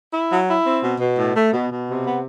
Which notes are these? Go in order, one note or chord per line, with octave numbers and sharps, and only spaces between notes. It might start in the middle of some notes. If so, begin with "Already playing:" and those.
E4
F#3
E4
C4
B2
B2
A2
A3
B2
B2
C3
B3